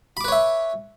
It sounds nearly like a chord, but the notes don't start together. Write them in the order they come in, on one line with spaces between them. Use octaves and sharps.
B5 D6 B4 C#5 E5